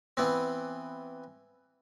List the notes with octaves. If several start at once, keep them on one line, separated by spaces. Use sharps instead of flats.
E3 B3 C4